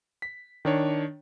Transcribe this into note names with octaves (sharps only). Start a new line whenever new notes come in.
B6
D#3 D4 C#5